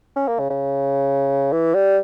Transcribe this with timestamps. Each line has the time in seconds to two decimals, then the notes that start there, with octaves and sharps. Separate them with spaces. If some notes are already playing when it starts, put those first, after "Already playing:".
0.16 C#4
0.28 A#3
0.39 C#3
0.50 C#3
1.52 E3
1.74 G3